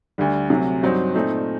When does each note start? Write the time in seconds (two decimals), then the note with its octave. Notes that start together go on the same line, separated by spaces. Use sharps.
0.18 D2 D3 G3
0.50 D2 C3 F#3
0.83 G2 F#3 C4 D#4
1.15 A#2 A3 C4 D#4